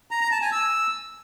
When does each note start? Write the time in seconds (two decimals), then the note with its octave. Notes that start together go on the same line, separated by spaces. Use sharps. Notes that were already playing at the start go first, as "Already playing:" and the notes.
0.11 A#5
0.21 A#5
0.32 A5
0.42 G#5
0.52 E6